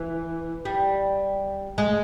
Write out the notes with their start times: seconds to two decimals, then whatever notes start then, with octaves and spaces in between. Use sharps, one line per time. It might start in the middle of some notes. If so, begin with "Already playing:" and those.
Already playing: E3
0.65 G3
1.78 G#3